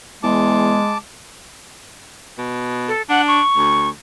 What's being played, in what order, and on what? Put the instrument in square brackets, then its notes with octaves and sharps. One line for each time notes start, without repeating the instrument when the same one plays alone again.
[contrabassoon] E2 [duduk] G#3 [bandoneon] A5 D6
[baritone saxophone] B2
[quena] A4
[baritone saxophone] D4 [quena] F#5
[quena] C#6
[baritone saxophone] D2